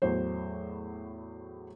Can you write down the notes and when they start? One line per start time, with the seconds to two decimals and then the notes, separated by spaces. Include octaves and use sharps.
0.02 E2 A2 F#3 C5